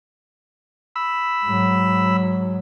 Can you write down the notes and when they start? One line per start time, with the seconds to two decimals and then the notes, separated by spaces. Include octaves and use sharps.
0.96 B5 E6
1.44 G#2 F#3